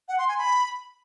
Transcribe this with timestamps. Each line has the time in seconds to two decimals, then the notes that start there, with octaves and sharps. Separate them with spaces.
0.08 F#5
0.18 C6
0.28 G#5
0.38 B5